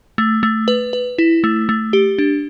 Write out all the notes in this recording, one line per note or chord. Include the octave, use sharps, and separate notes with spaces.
A3
A3
B4
B4
E4
A3
A3
G4
D4